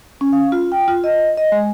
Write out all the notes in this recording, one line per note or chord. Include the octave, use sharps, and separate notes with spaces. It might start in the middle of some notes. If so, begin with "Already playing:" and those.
C#4
F5
F4
G5
F4
D#5
D#5
G#3